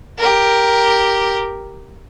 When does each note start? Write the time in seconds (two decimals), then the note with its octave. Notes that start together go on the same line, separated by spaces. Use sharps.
0.18 G4 A#4